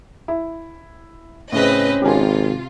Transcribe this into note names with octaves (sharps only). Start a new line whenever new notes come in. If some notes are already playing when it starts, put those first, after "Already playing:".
E4
A2 C#3 C4 C#4 B4 D#5
G#1 C3 F4 G4 A#4 G#5